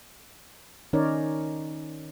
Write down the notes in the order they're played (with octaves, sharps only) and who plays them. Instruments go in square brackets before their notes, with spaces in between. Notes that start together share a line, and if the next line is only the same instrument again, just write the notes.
[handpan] D#3 C#4 D#4 A#4 C#5 D5